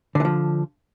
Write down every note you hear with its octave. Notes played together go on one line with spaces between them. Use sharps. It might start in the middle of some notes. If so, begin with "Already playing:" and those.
D3 E3 F3